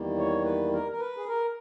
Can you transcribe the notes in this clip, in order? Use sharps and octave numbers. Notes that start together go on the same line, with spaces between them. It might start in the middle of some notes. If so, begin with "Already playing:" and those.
Already playing: E2 D#3 G3 A#3
C#5
B4
A#4
A#4
B4
G#4
A#4